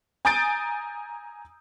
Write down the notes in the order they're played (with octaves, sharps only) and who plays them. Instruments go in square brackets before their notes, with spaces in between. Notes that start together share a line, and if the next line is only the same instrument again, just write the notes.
[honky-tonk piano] G#5 A#5 D#6 G6 A6 D7